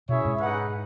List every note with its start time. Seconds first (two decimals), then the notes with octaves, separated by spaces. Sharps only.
0.09 B2 C#4 E4 G#4 C#5 E5
0.25 G#2
0.40 D#4 G#4 B4 F#5